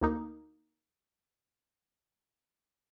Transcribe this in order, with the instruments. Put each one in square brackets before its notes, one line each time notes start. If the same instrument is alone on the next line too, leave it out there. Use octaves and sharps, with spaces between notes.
[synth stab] D2 A#3 D#4